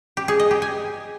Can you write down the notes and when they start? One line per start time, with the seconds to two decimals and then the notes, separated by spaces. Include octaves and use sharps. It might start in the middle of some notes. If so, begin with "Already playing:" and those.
0.17 G4
0.28 G#4
0.39 D#5
0.51 G4
0.62 G#5